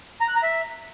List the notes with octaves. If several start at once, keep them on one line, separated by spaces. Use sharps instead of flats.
A#5
F#6
A#5
E5